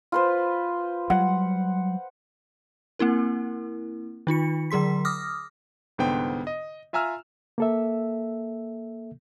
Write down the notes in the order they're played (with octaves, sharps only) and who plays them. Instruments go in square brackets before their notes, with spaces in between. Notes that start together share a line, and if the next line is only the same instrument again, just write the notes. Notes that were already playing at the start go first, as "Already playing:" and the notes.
[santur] F4 B4 C5
[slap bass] F#3 G3 [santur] F#5
[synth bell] A#3 C4 E4 A#4
D#3 D#4 F4 C#7
D3 F#3 G#4 C6 B6
D6 D#6 F6 A#6
[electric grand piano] C2 G#2 D3 B3 C5 G5
D#5
F4 E5 G#5 A#5 E6 F6
[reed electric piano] A#3 A4 E5